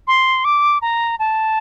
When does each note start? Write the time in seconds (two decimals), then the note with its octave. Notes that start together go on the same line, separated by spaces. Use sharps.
0.07 C6
0.44 D6
0.82 A#5
1.19 A5